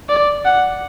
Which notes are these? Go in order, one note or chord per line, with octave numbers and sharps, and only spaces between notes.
D5
F#5